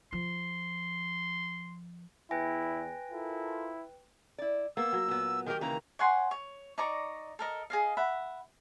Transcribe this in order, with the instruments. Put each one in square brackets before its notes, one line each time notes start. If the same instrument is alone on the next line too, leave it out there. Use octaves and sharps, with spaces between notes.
[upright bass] F3 [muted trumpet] C6
[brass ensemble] E2 [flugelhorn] E4 [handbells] B4 G5 [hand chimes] G#5 A#6
[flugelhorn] E4 [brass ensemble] F4 A4 A#4
[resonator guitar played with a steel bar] E4 D5
[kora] A#3 [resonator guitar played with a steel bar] B3 [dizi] E6
[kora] F#3
[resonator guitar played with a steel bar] A#2 B3
[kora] D#3 G4 [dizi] A#4
[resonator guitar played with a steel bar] C#3 E3 A#3 [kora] G4 [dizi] A#5
[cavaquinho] C#5 F#5 G#5 C6
C#5
D#4 D5 A#5 C#6
A4 A#4 D#5
G#4 D#5 F5
E5 F#5 B5